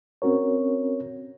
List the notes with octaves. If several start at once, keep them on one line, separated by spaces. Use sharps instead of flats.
C4 C#4 F#4 A#4 C#5